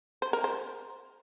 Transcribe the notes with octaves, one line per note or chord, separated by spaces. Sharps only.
C5
A#4
C5